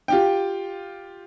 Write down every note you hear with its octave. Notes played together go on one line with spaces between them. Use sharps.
F4 G4 G5